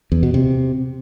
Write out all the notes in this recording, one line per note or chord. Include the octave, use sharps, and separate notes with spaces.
E2
B2
C3